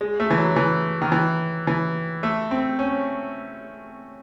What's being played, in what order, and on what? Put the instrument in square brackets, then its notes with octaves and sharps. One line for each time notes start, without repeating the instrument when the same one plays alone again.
[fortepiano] G#3
A3
E3
F#3
E3
D#3
E3
E3
A3
C4
C#4